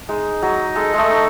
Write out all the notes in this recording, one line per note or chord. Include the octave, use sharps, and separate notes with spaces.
G#3 D#4
F#3 D#5
G#3 A4
G#3 A3
D#4